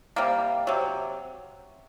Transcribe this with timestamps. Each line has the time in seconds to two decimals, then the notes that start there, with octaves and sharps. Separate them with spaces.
0.16 C3 G3 A#3
0.67 C3 F#3